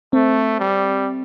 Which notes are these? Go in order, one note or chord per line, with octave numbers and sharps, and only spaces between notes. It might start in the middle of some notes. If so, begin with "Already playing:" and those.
A3 C4
G3